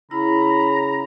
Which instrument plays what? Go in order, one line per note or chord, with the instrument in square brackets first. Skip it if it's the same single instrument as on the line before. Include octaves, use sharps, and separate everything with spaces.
[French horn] C#3 [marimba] E4 [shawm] A#5 [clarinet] B5